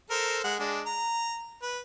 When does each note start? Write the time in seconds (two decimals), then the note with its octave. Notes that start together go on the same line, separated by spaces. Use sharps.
0.10 A4 A#4 C5
0.44 G#3 F#5
0.60 G#3 D4
0.86 A#5
1.62 B4